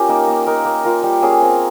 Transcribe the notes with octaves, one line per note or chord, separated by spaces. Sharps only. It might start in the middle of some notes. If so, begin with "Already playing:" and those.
Already playing: C#4 F4 G4 A#4
A#3 D#4
A#3
D#4 A#4
A#3
F4 A#4
G3
A#3 C#4 G#4
C4